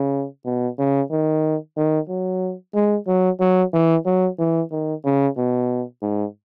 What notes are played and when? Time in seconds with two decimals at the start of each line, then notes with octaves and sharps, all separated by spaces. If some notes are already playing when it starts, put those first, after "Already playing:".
Already playing: C#3
0.45 B2
0.79 C#3
1.10 D#3
1.77 D#3
2.09 F#3
2.75 G#3
3.07 F#3
3.40 F#3
3.73 E3
4.06 F#3
4.39 E3
4.71 D#3
5.05 C#3
5.37 B2
6.02 G#2